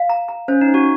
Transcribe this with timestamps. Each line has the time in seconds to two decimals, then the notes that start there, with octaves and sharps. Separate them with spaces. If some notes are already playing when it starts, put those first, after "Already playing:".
Already playing: F5
0.09 A#5
0.28 A#5
0.48 C#4 C5
0.61 D#4
0.68 C5
0.74 F#4